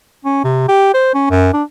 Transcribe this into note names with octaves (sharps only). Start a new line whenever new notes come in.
C#4
C3
G4
C5
C#4
F#2
D4